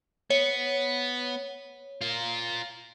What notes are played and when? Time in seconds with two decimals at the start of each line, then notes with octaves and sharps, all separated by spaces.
0.30 B3 C#5
2.01 F4 A#4